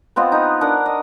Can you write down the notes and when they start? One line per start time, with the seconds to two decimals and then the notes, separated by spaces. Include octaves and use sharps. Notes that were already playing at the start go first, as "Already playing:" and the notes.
0.16 B3 C4 F4 D#5
0.32 D#4 B4
0.61 D4 A#4 F#5
0.86 D#5